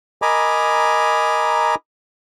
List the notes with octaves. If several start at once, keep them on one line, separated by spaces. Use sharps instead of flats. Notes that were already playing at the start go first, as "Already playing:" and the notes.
A#4 D#5 G#5 A#5 B5 D6